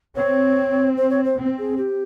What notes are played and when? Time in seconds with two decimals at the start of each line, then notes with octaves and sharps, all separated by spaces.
0.16 C4 C#5
0.97 C5
1.10 C#5
1.24 C5
1.37 C4
1.58 G#4
1.77 G4